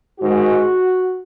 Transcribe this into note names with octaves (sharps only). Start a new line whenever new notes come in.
G#2 D#3 G#3 F#4